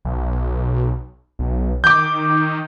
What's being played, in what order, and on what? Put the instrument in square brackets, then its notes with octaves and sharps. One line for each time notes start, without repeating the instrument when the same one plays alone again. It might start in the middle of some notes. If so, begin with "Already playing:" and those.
[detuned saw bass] B1
B1
[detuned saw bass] D#3 [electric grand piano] D6 G6